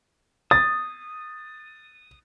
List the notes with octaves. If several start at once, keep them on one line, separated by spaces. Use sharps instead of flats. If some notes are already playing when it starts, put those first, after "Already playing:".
D#6 A6